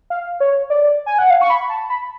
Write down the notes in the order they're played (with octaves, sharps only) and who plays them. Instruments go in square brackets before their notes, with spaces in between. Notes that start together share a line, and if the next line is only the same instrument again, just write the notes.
[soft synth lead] F5
C#5
D5
G#5
F#5
F5
C#6
B5
A5
B5